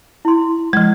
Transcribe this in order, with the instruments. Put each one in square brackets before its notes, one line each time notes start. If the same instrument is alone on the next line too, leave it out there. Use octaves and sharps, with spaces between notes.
[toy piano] E4 C6
[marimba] F3 G#3